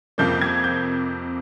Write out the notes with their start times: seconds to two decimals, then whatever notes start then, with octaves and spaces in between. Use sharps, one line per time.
0.18 F2 C3 F3 A#3 G6
0.42 G#6
0.64 G6